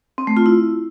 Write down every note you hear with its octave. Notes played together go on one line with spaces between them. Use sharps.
C4
A3
F4
E4